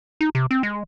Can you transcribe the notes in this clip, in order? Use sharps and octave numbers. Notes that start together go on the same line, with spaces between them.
D#4
C3
C4
G#3